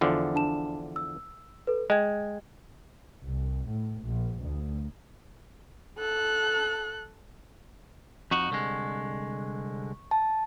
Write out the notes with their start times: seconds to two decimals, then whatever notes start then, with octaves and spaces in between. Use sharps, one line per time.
0.01 E2 D3 F3
0.35 D4 A5 E7
0.96 E6
1.67 A4 B4
1.90 G#3 D#5 G5 G#6
3.25 C2
3.69 A2
4.04 A#1
4.39 D2
5.99 A4 F#6
8.31 F2 D#4 F#4 C#6
8.50 C2 D3 G#3
10.11 A5